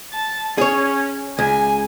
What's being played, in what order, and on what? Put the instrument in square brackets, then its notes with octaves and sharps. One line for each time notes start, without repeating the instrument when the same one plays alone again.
[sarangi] A5
[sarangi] C#4 [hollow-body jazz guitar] G#4 C#5
[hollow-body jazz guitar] C#2 [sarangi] G#5